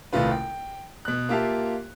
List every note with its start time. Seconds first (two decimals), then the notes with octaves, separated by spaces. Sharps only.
0.13 D#1 C2 A3 F4 B4
0.31 G5
1.05 B2 F#6
1.29 A#3 F4 G4 E5 F5 A5